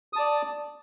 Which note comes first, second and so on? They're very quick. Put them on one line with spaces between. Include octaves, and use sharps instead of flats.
D#6 A5 D5